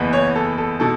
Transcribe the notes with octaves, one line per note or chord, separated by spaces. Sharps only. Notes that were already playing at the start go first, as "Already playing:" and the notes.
Already playing: F#1 E2 E3 B3
C#5
A4
A4
B2 A4